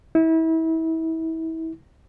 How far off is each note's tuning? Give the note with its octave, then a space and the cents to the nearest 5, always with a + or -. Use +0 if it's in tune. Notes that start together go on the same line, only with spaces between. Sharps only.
E4 -30